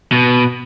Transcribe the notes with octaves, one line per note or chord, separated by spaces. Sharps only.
B2